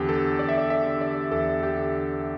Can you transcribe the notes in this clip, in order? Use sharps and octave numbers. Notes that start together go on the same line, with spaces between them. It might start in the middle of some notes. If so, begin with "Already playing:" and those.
Already playing: E2 D3 G4
A4
E2 D5
E5
D5
E5
D3
D5
E2 A4
G4
D3